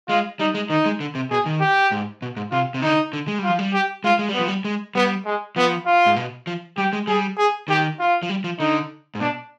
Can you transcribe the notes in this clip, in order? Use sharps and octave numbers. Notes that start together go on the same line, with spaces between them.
G#3 F4
G3 D#4
G#3
D#3 D#4
G#3
D3
C3
B2 G#4
D#3
G4
G#2
B2
G#2
C3 F4
C3
D3 D#4
D3
G#3
G3
F4
F3
G3
G4
G#3 F4
G#3
G3
B3
F3
G3
G#3
G3 B3
G#3
F3 B3
F4
G#2
B2
F3
G3 G4
G#3
G3 G#4
G#4
D#3 G4
F4
F3
G3
F3
D3 D#4
G#2
B2 D4